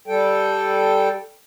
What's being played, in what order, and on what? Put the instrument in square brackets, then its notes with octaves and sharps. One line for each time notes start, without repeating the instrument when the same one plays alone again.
[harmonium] G3 A4 G5